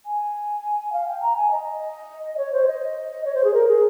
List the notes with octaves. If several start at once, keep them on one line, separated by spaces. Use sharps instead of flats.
G#5
F5
G5
A#5
G#5
D#5
C#5
C5
D#5
C#5
C5
G#4
A#4
G#4